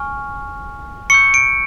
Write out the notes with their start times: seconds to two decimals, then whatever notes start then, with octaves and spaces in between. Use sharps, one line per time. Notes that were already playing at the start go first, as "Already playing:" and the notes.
Already playing: G#5 C#6 F6
1.10 C#6 E6 G6 C#7
1.34 D7